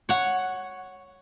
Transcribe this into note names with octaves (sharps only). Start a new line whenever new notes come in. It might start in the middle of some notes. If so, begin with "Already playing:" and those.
C#5 F#5